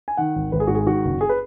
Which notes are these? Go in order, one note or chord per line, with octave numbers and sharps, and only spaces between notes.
G#5
D#3 F#5
G#1
G#1 B4
G#4
G#2 F#4
G#4
D#3 F#4
F#1
G#4
B4